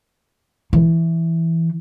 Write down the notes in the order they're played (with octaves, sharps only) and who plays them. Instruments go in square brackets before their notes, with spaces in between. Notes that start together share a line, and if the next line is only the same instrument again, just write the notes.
[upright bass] E3